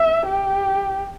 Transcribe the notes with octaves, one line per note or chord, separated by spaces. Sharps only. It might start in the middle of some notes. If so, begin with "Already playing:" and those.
Already playing: E5
G4